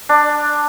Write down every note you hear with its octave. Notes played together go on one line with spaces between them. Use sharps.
D4